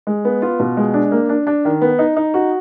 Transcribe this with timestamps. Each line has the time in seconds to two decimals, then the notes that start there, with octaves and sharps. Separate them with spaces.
0.07 G#3
0.25 B3
0.42 F4
0.60 B2
0.77 G#3
0.94 D4
1.11 A#3
1.29 D4
1.47 D4
1.65 D#3
1.81 B3
1.99 D#4
2.17 D#4
2.34 F#4